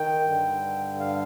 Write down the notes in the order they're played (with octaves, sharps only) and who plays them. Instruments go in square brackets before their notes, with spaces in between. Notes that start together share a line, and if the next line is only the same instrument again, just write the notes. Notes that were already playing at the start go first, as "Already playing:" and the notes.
Already playing: [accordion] D#3 G5
G2 D3
F5